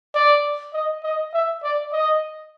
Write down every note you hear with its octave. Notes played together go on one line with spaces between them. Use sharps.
D5
D#5
D#5
E5
D5
D#5